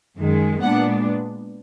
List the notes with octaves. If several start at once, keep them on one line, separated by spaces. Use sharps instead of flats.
F#2 D#3 G#3
A#2 G#3 B3 D4 F#5